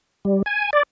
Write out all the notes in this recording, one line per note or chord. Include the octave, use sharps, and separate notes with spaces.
G3
G#5
D5